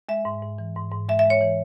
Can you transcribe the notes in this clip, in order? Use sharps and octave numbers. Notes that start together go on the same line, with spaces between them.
G#3 E5
G#2
G#2
E3
G#2
G#2
G#3 E5
E5
G#3 C#5
E3